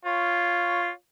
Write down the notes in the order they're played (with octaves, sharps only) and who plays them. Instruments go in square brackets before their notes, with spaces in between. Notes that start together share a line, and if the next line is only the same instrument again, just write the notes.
[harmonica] F4 C#5